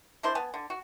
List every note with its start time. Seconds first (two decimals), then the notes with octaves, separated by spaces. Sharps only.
0.23 G#3 D4 E4 C5
0.35 B3 G#5 A5
0.54 D3
0.70 F#4